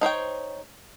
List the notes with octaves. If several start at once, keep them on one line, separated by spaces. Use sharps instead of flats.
D#4 C5 C#5 G5